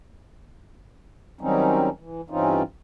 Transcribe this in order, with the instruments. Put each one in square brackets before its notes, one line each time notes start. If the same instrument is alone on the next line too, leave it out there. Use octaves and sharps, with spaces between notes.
[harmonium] D#3 F#3 G3 C4 C#4 D#4
E3
G2 E3 C4 C#4 D#4 F4